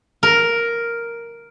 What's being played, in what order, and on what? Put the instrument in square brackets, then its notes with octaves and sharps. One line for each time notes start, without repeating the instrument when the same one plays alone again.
[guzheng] A#4